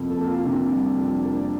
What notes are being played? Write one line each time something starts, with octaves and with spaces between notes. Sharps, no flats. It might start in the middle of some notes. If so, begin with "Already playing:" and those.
Already playing: F2 C3 A#3
A4
A#3
F4
C3 D4
G3
F2
A#3